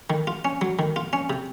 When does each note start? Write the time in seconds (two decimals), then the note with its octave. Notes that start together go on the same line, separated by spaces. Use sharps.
0.10 D#3
0.27 F4
0.45 C#4
0.61 F#3
0.79 D#3
0.96 F4
1.13 C#4
1.30 C3